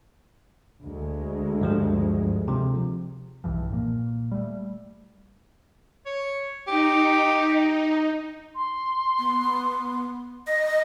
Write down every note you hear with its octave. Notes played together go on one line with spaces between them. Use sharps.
D2 G#3
G2 F3 G4
C3 F3
B1 G2 E3 F3
A#2 A#3
G3 A3
C#5
D#4 G4
C6
B3
D#5 A#6